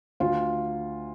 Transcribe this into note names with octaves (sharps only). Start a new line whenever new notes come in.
D2 F4